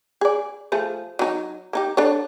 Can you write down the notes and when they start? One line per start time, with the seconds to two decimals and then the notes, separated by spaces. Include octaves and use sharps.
0.21 G#4 D5
0.72 F3 A3 G#4
1.19 F#3 D#4
1.73 A#3 D#4 G4
1.97 D4 A4 C#5